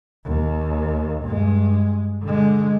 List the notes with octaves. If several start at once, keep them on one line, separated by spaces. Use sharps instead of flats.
D#2
G2 G#3
D3 G#3